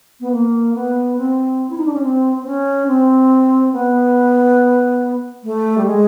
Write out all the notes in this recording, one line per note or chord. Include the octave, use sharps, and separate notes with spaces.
B3
A#3
B3
C4
E4
D#4
D4
C#4
C4
C4
C#4
C4
B3
A3
G3
G#3